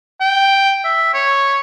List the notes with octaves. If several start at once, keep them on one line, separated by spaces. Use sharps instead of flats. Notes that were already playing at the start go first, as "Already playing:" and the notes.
G5
E5
C#5